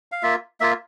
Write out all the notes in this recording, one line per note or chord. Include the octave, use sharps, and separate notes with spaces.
F5
A#3 F4 E5
A#3 F4 E5